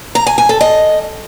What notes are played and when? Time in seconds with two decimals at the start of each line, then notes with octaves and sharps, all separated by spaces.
0.15 A#5
0.26 G#5
0.38 G#5
0.49 A4
0.61 D#5